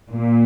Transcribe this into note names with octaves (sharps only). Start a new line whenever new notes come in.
A#2